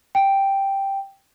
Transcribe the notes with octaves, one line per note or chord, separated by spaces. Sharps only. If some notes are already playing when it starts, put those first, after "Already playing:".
G5